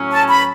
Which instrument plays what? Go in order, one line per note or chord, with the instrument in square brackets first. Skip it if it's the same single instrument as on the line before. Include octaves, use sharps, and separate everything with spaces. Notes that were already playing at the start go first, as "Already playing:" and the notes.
Already playing: [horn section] A2 F#3 C#4
[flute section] A5
B5